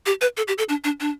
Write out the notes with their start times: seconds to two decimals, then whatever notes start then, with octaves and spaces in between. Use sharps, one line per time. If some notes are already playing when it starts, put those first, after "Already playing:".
0.06 G4
0.21 B4
0.37 A4
0.48 G4
0.58 A4
0.69 D4
0.84 D4
1.00 D4